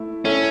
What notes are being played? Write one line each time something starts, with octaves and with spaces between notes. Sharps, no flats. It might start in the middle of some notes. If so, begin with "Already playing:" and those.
Already playing: A3 E4
A3 C#4 E4 A4 E5